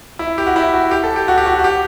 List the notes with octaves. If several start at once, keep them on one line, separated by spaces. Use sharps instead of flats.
E4
G4
F#4
E4
F#4
G4
A4
G4
F#4
G4
F#4
F#4
G4